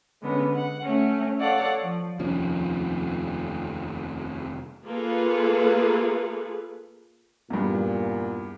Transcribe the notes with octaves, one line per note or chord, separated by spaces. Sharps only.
D3 G#3 B3 C#4
F#5
A3 C#4
A4 C#5 D5 F5 F#5
F3
F1 D#2 F3 C#4
A#3 F4 G#4 A4 B4
E2 G2 A#2